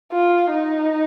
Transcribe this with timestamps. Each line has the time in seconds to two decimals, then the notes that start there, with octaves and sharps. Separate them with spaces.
0.12 F4
0.52 D#4